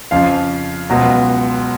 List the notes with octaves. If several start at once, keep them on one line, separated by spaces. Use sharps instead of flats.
F2 C#3 F3 F5
C#2 B2 F#3